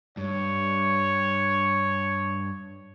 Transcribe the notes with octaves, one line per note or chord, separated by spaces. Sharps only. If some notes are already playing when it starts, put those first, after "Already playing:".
G2 C#5